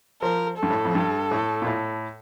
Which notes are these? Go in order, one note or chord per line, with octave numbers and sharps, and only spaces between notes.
F3 A#4
G2 A4
A2
F2
G2
A2
A#2
A2